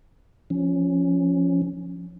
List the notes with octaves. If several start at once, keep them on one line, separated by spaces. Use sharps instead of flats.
F3 C#4